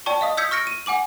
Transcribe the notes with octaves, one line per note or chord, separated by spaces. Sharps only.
D5 G5 A5 C#6
D#5 F5 D#6
D#6 E6 G6 G#6 B6 C#7
C#6 F6 A#6 C#7 D7
D#7
F#5 G#5 D6 F#7